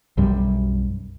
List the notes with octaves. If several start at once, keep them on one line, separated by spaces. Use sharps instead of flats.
B1 F#2 G3